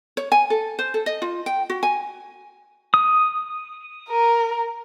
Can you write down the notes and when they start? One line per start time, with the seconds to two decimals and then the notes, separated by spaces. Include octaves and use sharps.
0.17 C#5
0.32 G#5
0.50 A4
0.79 C5
0.94 A4
1.06 D#5
1.22 F4
1.46 G5
1.70 F#4
1.83 G#5
2.94 D#6
4.09 A#4